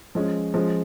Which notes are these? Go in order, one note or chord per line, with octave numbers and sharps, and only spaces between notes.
F3 G#3 C#4
F3 G#3 C#4